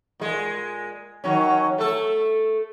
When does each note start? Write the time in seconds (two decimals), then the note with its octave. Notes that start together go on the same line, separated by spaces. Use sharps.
0.20 A#2 G#3
1.24 D#3 F#3 C#4
1.78 A3 A4